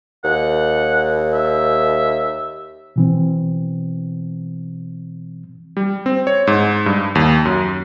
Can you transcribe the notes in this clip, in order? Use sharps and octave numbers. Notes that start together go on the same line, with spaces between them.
D#2 F#5
E5
B2 E3 C4
G3
C4
C#5
G#2
G2
D#2
F#2